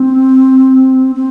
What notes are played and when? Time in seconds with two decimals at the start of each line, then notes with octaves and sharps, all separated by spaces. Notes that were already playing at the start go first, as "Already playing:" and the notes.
Already playing: C4
1.16 C4